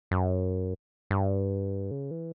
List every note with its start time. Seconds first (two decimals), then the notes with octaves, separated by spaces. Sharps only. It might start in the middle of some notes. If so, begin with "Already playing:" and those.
0.11 F#2
1.11 G2
1.91 C#3
2.11 E3